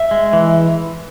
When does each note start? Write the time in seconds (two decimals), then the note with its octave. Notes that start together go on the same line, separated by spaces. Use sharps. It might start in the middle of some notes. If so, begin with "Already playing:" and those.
Already playing: E5
0.11 G#3
0.33 E3